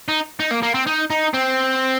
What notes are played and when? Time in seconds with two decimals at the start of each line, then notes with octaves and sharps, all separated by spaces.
0.08 D#4
0.40 D#4
0.51 A#3
0.63 A#3
0.74 C4
0.87 D#4
1.10 D#4
1.34 C4